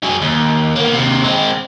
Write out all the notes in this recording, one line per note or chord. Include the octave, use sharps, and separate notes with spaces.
F#3 G#4
D#2
A#3 B3
D#2 C3
G#3 C4